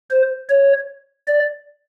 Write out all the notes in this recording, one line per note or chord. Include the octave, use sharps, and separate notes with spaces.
C5
C#5
D5